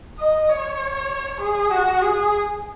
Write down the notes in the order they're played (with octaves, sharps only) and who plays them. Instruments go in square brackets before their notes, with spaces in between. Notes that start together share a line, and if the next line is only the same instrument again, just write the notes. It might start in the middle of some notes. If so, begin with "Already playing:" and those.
[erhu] D#5
C#5
G#4
F#4
G#4